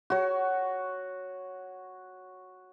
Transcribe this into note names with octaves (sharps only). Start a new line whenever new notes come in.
F#4 C#5